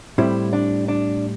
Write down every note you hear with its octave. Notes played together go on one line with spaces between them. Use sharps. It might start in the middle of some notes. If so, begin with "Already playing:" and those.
A2 G3 C4 E4
D4
D4